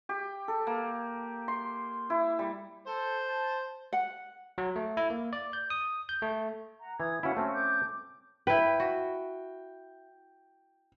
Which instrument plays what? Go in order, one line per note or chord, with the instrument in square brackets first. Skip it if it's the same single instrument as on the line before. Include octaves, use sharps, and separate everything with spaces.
[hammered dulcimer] G4
A4
A#3
C6
E4
G3
[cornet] A4 [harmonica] C5
[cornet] A5
[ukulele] F#5
[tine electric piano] F#3
A3
E4
A#3
D5
G6
D#6
G6
A3
[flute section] F#5 A#5
[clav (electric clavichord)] E3 [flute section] D#6 G#6
[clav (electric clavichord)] C#4 E4 [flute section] F#4 F5 F#5
[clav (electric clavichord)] A3 C4 C#4 [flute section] A4
[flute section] A5 D6 G6
[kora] E4 B4 [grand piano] G5
[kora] F#4